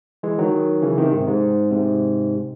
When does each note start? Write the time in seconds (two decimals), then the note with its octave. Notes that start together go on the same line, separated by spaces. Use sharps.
0.23 E3 G#3
0.39 D#3 F#3
0.82 C#3 E3
0.98 C3 D#3
1.12 G#2 C3
1.27 G#2
1.71 G#2 C3